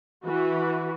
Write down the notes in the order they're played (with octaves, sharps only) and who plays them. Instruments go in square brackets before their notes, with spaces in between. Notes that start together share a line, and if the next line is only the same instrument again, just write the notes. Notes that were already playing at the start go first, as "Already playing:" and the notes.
[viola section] E3 F#4 B4